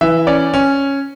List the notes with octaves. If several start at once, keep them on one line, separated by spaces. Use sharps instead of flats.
E3 E5
C#4 D5
C#4